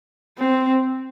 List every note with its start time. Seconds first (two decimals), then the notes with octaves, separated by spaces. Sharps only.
0.38 C4